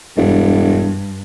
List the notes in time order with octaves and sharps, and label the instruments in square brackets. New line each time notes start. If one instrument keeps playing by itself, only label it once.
[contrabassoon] E1 [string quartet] G2